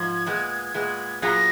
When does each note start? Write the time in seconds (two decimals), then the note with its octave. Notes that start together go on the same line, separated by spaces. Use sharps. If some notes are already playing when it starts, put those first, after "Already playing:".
Already playing: G#2 F3 G#6
0.26 A#2 G#3 B3
0.74 A#2 G#3 B3
1.22 A#2 F#3 B3 F4 G#4 A#6